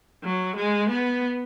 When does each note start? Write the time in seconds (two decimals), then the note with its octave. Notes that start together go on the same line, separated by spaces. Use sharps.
0.24 F#3
0.56 G#3
0.90 B3